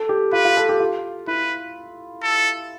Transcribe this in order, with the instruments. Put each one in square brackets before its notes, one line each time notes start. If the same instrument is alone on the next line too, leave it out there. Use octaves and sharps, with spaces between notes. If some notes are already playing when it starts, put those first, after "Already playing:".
Already playing: [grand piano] A4
G4
[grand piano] F4 [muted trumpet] B4
[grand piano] F4
A4
G4
F4
[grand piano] E4 [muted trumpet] B4
[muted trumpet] A4